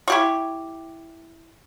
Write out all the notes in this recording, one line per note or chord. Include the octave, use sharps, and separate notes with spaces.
E4 G4 C#6